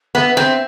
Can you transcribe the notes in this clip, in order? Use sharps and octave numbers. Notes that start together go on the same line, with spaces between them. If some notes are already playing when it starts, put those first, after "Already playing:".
B3 E5
C4